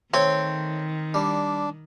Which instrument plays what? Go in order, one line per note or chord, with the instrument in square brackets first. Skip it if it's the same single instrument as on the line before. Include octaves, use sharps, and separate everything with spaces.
[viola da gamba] D#3 [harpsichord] A3 C#5 [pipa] C4
[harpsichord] G3 [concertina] D4